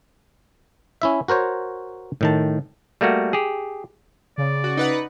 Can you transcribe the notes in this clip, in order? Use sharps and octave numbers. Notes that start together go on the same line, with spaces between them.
C#4 E4 E5
F#4 A#4 C5 C#5
A2 D#3 A5
G3 A3 A#3 F#4
G4 G#4
C#3 D5
F#4
D#4 B4 F#5